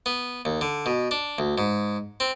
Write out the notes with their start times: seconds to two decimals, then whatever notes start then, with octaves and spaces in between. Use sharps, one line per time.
0.06 B3
0.45 D#2
0.61 D3
0.86 B2
1.11 D4
1.38 D2
1.58 G#2
2.20 C4